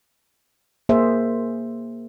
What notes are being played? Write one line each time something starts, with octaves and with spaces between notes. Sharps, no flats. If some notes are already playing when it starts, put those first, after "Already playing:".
A#3 G#4 C5 E5